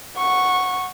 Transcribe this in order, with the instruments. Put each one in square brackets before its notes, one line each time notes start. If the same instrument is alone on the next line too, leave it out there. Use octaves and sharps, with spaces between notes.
[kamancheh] F#5 C#6